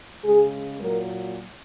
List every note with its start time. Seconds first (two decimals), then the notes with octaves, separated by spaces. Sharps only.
0.24 C#3 G#3 G#4
0.81 A#2 F#3 A#4